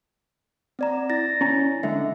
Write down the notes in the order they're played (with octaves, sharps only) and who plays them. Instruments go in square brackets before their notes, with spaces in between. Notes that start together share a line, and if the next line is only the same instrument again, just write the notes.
[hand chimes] C4 D5 A#5
E4 A6 A#6
[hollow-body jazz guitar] C#4 A#5
[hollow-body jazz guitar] D3 G#3 [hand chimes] E5